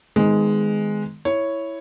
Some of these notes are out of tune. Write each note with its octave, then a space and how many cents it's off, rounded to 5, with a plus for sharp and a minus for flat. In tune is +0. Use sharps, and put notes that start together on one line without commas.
D#3 +0 G#3 +0 B3 +35
E4 +0 C#5 +0